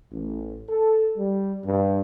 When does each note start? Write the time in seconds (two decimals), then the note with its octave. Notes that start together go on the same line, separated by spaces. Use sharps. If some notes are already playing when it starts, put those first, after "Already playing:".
0.11 A1
0.68 A4
1.17 G3
1.64 G2